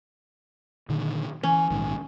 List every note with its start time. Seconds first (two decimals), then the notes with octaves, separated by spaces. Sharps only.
0.89 A#2 D3 D#3
1.43 E3 C#4
1.71 A#1 G#2 D#3